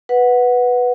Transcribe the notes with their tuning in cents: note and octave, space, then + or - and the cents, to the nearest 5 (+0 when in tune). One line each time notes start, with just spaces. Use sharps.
B4 +0 F#5 -10